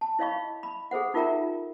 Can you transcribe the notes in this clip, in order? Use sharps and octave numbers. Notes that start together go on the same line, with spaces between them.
A5
E4 C#5 D#5 F5 B5 C#6
B5
G#4 A4 C5 F#5
D#4 F4 A#4 E5 G5 A#5